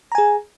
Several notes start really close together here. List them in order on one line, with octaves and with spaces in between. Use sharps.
A#5 G#5 G#4